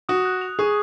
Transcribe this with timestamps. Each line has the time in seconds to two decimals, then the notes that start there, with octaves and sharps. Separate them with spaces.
0.09 F#4 D#6
0.25 F#6
0.41 F7
0.59 G#4 C#6